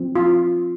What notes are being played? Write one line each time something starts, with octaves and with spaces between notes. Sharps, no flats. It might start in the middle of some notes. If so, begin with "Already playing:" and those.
Already playing: F3 C4
F4